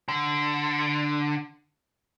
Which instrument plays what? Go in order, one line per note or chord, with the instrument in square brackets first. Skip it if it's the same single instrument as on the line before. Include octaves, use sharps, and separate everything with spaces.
[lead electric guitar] D3